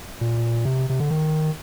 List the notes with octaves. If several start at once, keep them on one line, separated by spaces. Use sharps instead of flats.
A#2
C3
C3
D3
D#3